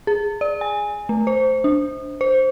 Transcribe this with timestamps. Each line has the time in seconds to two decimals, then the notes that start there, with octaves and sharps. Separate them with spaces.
0.07 G#4
0.41 D5
0.61 G#5
1.09 A3
1.27 C5
1.64 D4
2.21 C5